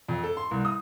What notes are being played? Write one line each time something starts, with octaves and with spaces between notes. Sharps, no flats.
F2
A4
C6
C2
D#6